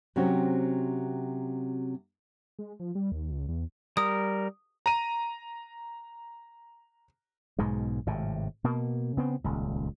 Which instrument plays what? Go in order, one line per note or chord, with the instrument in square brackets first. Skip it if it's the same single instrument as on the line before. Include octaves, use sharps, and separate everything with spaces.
[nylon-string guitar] C3 F#3 C4 C#4 F#4
[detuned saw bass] G#3
F3
G3
D#2
C#2
E2
[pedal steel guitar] G3 A#4 [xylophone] D#6
[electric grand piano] A#5 D#7
[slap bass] B1 G#2 B2 G#3
G#1 A2 C3
B2 A#3
C#3 B3 C4
D#1 C#2